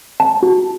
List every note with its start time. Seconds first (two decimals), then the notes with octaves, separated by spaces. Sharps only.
0.20 A5
0.43 F#4